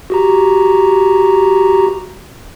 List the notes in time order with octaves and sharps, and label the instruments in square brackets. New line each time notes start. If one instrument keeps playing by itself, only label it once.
[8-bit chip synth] F#4 G4 A#5